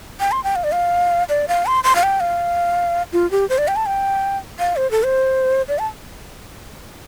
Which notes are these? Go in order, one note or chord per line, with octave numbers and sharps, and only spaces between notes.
G5
C6
G5
F5
D5
F5
D5
F5
C6
C6
F5
G5
F5
F4
G4
C5
D5
G5
A5
G5
F5
C5
A4
C5
D5
A5